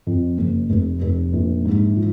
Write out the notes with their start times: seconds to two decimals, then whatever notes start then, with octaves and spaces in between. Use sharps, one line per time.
0.07 F2
0.38 F#1
0.70 F1
1.02 F1
1.33 A#1
1.65 G#2
1.96 F3